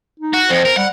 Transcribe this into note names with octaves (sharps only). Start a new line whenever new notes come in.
D#4
F#4
F2 C5
A#4
G3 F#5